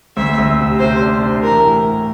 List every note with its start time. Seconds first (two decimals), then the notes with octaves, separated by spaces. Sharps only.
0.17 D2 E5
0.38 D2
0.59 C3
0.79 C3 C5
1.01 D4
1.22 C3
1.43 E3 A#4
1.65 A2
1.86 A2